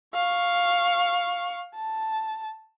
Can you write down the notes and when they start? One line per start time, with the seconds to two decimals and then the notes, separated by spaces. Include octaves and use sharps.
0.14 F5 C#6
1.75 A5